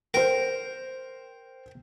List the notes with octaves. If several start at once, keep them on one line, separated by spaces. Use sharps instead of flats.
A#4 C5 G5